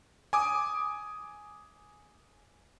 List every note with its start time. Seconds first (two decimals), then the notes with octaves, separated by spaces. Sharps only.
0.33 G#5 D6 D#6